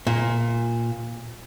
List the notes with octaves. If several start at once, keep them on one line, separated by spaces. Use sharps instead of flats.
A#2